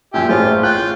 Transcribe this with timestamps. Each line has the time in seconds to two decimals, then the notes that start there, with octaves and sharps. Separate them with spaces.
0.14 F#2 A#2 G4 E5 G#5
0.29 A1 A2 F4 G#4 C5 C#5
0.63 F4 G5 F#6